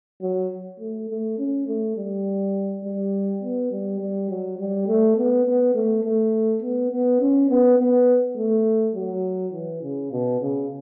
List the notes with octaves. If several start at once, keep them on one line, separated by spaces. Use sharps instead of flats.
F#3
A3
A3
C#4
A3
G3
G3
B3
G3
G3
F#3
G3
A3
B3
B3
A3
A3
B3
B3
C#4
B3
B3
A3
F#3
E3
C#3
B2
C#3